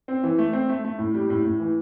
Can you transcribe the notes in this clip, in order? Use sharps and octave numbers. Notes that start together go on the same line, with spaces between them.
C4
E3
A3
C4
A3
A3
A2
G3
A2
A2
E3